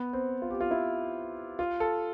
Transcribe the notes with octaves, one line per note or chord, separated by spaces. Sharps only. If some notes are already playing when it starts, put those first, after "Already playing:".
Already playing: B3
C4
F4
G4
F4
E4
F4
A4